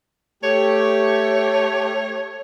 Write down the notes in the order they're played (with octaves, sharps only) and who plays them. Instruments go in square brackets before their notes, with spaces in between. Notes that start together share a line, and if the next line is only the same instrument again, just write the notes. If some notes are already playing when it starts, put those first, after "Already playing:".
[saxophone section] A3 G4 [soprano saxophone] C#5